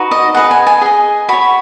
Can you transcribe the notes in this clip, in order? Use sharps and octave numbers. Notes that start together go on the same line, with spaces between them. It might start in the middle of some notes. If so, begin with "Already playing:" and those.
Already playing: D#4 F#4 B4
D#5
G#4 B4 D#5 F#5
G#5
G#5
G#4 D#5
F#4 C#5 B5